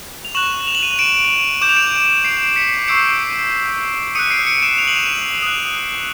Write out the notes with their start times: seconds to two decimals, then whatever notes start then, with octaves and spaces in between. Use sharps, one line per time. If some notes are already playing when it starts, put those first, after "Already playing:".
0.25 F7
0.35 C#6 F#6 E7 F#7
0.67 F7
0.75 F#7
0.83 D#7 F7
0.99 D7 E7
1.61 D6 G6 E7
1.69 F7
1.76 D7 E7
2.25 C7 D7
2.56 B6 C#7
2.88 C#6 E6 G6 C7 D7
4.15 D#6 F#6 C#7 D#7
4.30 C7 D7
4.47 C#7 D#7
4.62 D7 E7
4.78 F7
4.87 F#7
4.95 D#7 F7
5.43 D#6 F#6